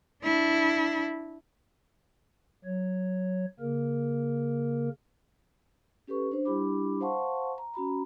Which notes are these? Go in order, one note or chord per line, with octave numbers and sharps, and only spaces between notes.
D4 E4
F#3 C#5
C#3 A#3 A#4
C#4 G4 A4 B4 C#6
D4 C5
G3 D4 E4 G4 B5 D6
C5 F5 F#5 A5 C6 C#6
A#5
C#4 F#4 A#5 B5